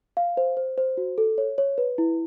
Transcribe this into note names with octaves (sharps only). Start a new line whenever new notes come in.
F5
C5
C5
C5
F#4
A4
C#5
C#5
B4
E4